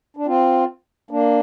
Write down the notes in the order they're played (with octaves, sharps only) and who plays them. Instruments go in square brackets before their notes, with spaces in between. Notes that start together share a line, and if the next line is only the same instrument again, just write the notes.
[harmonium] D4
C4 F4
A#3 D4